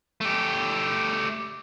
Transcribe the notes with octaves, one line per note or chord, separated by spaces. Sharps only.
A3 G4